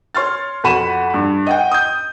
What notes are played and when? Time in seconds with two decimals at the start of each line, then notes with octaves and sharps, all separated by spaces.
0.15 C#5 C6 F6 A6
0.64 F2 F#4 F#5 B5 D#7 E7
1.14 G2
1.47 D#5 F#5 G5
1.72 D#6 G6